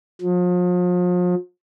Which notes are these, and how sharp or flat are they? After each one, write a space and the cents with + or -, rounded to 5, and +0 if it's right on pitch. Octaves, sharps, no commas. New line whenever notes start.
F3 +40